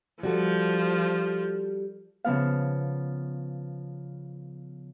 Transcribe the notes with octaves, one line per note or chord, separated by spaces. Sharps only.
F3 G3 F#4 A4
C#3 F3 B3 F5